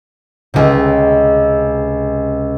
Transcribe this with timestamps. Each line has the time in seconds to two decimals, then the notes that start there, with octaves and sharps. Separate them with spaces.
0.54 C#2 C3